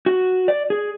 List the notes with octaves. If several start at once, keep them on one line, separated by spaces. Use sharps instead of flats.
F#4
D5
G#4